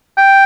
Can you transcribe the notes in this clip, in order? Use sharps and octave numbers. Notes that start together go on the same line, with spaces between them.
G5